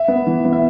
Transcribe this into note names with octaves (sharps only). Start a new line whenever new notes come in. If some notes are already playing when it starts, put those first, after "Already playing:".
Already playing: E5
B3
E3
B3
E5